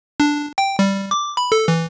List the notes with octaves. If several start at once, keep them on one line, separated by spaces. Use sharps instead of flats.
D4
G5
G3
D6
B5
A4
E3